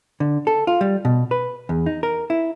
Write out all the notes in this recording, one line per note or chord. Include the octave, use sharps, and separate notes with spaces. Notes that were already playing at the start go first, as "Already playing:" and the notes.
D3
A4
F4
G3
B2
B4
E2
D#4
A#4
E4